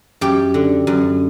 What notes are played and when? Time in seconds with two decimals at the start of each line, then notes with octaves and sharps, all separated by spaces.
0.21 F#2 G4
0.54 D3
0.87 F#2